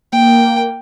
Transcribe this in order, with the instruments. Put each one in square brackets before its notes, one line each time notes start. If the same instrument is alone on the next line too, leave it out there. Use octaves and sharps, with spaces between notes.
[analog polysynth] A#3 [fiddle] G5